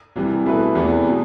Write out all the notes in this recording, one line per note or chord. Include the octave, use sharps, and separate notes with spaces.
C2 C3 E3
B2 A3 E4 B4
E2 C3 E3 B3
B2